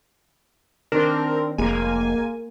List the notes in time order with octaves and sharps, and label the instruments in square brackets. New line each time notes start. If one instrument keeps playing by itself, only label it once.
[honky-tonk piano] D#3 [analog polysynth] C4 [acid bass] D4 [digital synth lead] A#4
[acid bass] F1 [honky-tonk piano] G#3 [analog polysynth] A#3 [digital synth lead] G#5